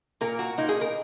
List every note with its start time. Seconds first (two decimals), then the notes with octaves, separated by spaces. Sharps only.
0.21 A#2 A#3 A#4
0.39 F#4
0.58 A#2 A#3 D#4
0.69 G#4
0.81 A#4